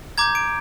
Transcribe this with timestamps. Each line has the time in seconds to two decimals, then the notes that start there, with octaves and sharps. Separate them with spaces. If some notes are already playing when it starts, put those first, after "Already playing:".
0.18 A#5 D6 G6 G#6
0.35 D7